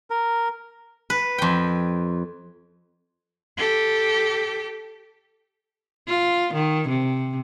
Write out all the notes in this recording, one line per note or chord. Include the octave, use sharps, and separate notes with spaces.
A#4
B4
F2 G5
G4 A4
F4
D#3
C3